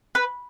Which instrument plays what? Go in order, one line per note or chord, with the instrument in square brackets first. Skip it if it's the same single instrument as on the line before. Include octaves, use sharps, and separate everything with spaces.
[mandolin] B4